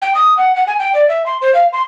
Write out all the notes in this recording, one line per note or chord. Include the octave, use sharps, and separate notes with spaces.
G5
D#6
F#5
F#5
G#5
G5
D5
E5
C6
C5
F5
C6